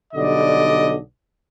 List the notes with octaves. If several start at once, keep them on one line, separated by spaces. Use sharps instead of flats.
B1 D3 G3 D5 D#5